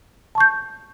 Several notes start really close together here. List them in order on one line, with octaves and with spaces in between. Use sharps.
A5 C#6 G6